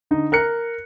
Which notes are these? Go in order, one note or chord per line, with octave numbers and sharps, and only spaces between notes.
D3 D#4
A#4 F#6 C#7